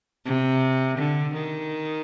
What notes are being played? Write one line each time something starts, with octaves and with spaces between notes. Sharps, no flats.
C3
D3
D#3